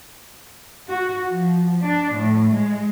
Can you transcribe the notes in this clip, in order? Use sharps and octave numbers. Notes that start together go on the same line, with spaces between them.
F#4
F3
D4
A2
G#3